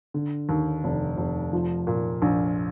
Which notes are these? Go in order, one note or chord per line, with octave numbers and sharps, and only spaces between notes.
D3
D#2
F1
F1
F3
A#2
A#1